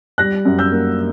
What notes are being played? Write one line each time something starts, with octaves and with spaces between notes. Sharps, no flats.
G3 F#6 A#6
F#2
E6 G6
A#3